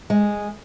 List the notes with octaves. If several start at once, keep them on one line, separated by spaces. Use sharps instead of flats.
G#3